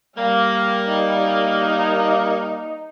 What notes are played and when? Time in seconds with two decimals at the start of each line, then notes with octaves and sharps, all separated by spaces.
0.17 G3 A#3 F5
0.89 D#4